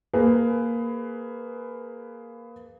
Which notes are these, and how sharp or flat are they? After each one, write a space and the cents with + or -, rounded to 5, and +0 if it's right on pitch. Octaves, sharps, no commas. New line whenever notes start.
A#3 +0 G#4 +15 B4 +15